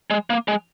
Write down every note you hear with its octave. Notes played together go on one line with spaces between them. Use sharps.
G#3
A#3
G#3